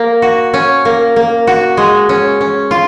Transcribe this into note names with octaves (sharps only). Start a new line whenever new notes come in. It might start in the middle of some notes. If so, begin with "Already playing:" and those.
Already playing: A#3
F#4
C#4
A#3
A#3
F#4
G#3
C#4
C#4
F4